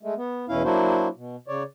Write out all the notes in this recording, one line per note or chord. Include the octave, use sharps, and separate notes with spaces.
G#3 A3
B3
E2 B2 C#4 E4 F5
F#3 A#3 D4 E4 F#4 C5
B2
C#3 C#5 D5